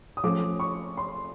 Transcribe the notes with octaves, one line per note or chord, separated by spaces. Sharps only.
D#6
F3 A3 C#4 D6
C#6
C6